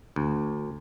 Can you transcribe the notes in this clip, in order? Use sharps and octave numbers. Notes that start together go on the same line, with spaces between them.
D2